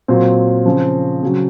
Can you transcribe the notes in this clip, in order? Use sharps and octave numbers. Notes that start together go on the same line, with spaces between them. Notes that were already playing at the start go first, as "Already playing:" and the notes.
A#2 F#3 C4
C#3 F3
C#3 F#3